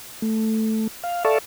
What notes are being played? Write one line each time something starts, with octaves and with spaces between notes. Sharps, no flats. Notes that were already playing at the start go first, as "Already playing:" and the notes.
A3
F5
A4 D5 E5 F5 A5 C#6